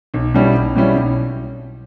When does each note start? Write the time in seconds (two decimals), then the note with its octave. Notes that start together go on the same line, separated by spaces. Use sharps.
0.14 B1
0.34 B2 G3 C#4 E4
0.54 B1
0.75 B2 G3 C#4 E4
0.96 B1